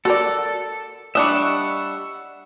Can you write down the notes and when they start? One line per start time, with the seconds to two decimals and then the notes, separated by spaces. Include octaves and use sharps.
0.05 F#4 A4 A#4 D5
1.15 G3 D4 D#5 E5 F#5 C#6